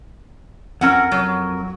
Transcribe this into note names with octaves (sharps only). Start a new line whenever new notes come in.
F2 C4 C#4 A#4 F#5
F#3